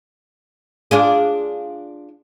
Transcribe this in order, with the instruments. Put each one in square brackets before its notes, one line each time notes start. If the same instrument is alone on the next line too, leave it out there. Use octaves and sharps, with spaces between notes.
[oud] D4 F4 G#4